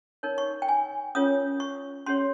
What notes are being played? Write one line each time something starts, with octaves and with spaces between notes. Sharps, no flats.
D#4 A#4 C#5
C#6
G5
G#5
C#4 F4 A#4 C#5 D#6
C#6
C#4 G4 C#5 C6